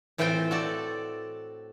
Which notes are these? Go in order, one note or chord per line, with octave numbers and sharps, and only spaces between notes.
A2 E3 C4 F4 C5 G5
F#4 A4 D5